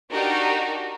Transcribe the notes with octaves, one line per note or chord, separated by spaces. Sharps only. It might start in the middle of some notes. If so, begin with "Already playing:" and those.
D4 D#4 F#4 G4 A#4